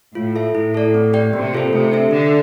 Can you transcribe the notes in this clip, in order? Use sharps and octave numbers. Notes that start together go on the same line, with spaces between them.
A2 F4
A4 E5
A2 E4
A4 D5
C4
G4 D5 G5
C3 A#3
F4 A4 C5
C3 A3
D4 A4 E5
D3 D4